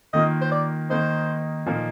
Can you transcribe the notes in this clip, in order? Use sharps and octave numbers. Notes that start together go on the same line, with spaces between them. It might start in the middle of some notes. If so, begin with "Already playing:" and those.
D#3 A#3 F4 D#5
C5
D5
D#3 A#3 D#4 C5
A#2 F3 A#3 D#4